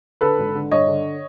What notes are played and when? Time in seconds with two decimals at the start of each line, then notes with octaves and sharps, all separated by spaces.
0.21 D3 A4 B4
0.38 G#1
0.55 D3
0.71 G2 C#5 D#5
0.88 D3